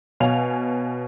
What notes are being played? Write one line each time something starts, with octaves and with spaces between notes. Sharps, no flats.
B2 C#5 F5 G#5 F7